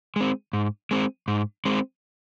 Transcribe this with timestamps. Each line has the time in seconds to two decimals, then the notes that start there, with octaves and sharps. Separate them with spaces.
0.16 G#3 C4
0.53 G#2
0.91 G#3 C4
1.28 G#2
1.65 G#3 C4